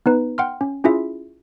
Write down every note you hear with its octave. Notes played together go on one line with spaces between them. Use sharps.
B3 D#4 B4
F#5 G5 C6 F6
C#4
C#4 E4 F4 G#4 E5